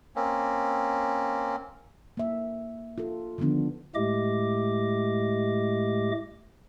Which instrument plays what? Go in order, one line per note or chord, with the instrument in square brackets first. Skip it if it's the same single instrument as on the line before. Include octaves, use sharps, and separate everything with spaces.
[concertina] A#3 C4 C#4
[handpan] A#3 E5
F4 A4
D3 D#3 F3 B3 D4
[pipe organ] A2 G#3 A3 G4 D#5 D6